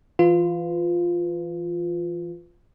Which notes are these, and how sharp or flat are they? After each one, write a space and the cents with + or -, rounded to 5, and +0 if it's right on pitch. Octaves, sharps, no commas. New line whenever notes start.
E3 +20 F4 +0 B4 +30